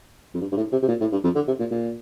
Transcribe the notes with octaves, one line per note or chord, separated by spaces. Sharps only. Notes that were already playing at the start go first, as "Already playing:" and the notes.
F2
G2
G2
A2
C3
C3
A#2
A2
G2
F2
D3
C3
A#2
A#2